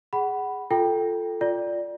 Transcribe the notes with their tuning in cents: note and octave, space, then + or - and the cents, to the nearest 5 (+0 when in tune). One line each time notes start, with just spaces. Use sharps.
G#4 +0 F#5 +20 B5 +0
F4 +0 A4 +0 G5 +0
F4 +0 D5 +0